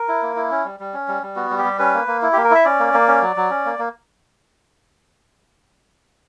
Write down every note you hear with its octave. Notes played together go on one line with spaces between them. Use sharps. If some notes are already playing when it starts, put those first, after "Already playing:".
Already playing: A#4
E4
A#3
E4
C#4
G3
G3
C#4
G3
G3
B3 F#4
G3
G4
G3
C#4 B4
A#3
A#3
E4
A#3 G4
A#4
E4 E5
C#4 D5
A#3
A#3
C#4
F#3
F#3
C#4
A#3
A#3